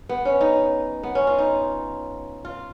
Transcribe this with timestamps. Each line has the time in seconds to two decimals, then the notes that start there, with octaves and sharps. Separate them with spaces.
0.09 B3
0.25 C#4
0.41 D#4
1.03 B3
1.15 C#4
1.27 F4
1.38 D#4
2.45 F4